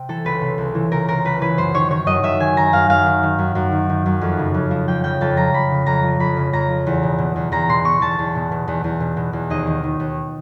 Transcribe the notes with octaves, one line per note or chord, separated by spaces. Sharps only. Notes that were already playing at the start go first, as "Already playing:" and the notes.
Already playing: C3 G5
E3 A4
C#2 B4
C3
C#2
E3
C#2 A#4
C3 A#4
C#2 B4
E3 B4
F#2 C5
D#3 C#5
D#3 C#5
F#2 D#5
F#2 E5
D#3 G#5
D#3 A#5
F#2 F5
F#2 F5
D#3
D#3
F#2
F#2
D#3
D#3
F#2
F2
C#3
F2
F3
F2 G5
C#3 G5
F2 A5
F3 A#5
F2 B5
C#3
F2 A#5
F3
F2 B5
C#3
F2 A#5
F3
E2
B2
B2
E2
E2 A#5
B2 C6
B2 C#6
E2 A5
E2
B2
B2
E2
E2
B2
B2
E2
D#2 D#5
D#3
D#3
D#2